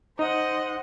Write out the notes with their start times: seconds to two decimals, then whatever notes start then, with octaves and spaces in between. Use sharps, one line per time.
0.19 D#4 C5 D#5 F#5